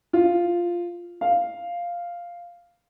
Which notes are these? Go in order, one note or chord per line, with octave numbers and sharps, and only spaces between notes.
F4
F5